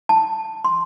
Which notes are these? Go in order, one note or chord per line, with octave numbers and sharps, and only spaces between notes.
A5
C6